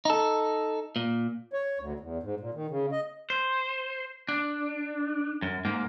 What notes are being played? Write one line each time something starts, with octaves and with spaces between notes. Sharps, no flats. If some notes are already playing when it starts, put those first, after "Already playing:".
D#4 A4
A#2
C#5
D2
E2
G#2
A#2
D#3
C#3
D#5
C5
D4
F#2
G#2 A#3